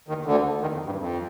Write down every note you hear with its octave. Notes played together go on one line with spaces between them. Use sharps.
D#2 D#3
D2 D3
D#2 D#3
F2
G2
F2